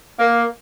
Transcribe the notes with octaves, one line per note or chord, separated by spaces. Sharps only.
A#3